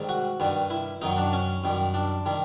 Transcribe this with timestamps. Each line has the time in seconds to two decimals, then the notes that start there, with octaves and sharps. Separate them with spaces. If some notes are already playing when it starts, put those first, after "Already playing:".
Already playing: G#2 D#3 G3
0.09 F#4
0.40 G2 D#3 G3
0.70 E4
1.02 F#2 D#3 F#3 D#4
1.17 D4
1.33 C#4
1.64 F#2 D#3 G3
1.94 D4
2.26 D#3 G3